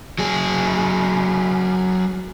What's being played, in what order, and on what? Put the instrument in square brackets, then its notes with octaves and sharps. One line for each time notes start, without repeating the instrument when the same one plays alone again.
[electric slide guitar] F#3 G#4